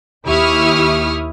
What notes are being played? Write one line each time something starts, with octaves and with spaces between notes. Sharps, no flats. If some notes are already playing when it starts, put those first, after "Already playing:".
D#2 E4 G4 C#6 D#6 F6